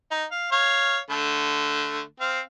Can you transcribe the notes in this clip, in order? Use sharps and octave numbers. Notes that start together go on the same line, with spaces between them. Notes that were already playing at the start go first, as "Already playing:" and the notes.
D#4
F5
C#5 F5
D3 A3
C4 F5